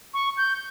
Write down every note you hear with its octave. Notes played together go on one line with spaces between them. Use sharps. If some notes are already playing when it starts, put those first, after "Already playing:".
C#6
G6